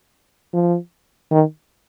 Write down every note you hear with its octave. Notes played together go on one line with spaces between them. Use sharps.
F3
D#3